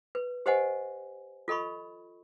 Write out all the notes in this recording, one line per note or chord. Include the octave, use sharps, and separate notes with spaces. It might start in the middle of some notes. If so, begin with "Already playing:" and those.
B4
G4 B4 C5 D#5 F#5 G#5
F4 A4 D#5 B5 C#6